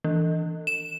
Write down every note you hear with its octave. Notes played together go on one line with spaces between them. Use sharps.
E3
E7